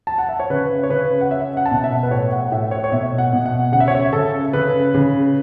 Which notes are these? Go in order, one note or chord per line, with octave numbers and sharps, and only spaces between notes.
A5
F#5
E5
C#5
C#3 B4
C#5
C#3 B4
F#5
C#4 E5
F#5
A5
B2 F#5
E5
B4
A2 C#5
F#5
A2 E5
C#5
C#5
B2 E5
F#5
B2
F#5
C#3 F#5
E5
C#5
E5
C#3 A4
C#3 B4
C#3